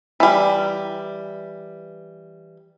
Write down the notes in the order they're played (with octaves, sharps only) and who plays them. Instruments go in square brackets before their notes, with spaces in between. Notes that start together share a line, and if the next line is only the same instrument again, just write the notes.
[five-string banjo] E3 G3